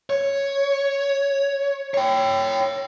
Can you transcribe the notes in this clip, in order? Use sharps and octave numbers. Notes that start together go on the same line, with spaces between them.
C#5
C#5 G5